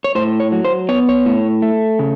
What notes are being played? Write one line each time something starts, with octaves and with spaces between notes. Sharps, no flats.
C#5
A2 C5
C#5
F#3
C5
B3 C#5
C#5
A2
A3
C#3